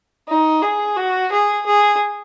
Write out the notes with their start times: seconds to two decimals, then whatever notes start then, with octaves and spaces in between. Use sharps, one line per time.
0.28 D#4
0.62 G#4
0.97 F#4
1.32 G#4
1.66 G#4